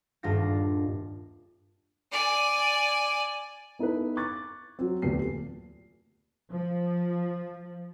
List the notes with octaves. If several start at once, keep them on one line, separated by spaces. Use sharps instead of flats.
D#1 G2 D4 F4 A6 A#6
D5 G#5
B3 D#4 E4 A4 B4
C#6 D6 F#6 G#6 A6
F#3 C4
D1 E2 A#2 A3 G4 C7
F3